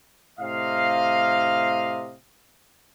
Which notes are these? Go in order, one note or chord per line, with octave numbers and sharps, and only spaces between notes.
A2 C3 D#5 F5